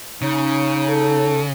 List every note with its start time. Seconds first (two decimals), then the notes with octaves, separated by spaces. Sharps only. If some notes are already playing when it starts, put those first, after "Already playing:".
0.22 C#3 C#4 D#4
0.89 A4